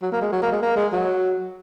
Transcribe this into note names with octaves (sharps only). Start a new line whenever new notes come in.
F#3
A#3
G#3
F#3
A#3
G#3
A#3
G#3
F#3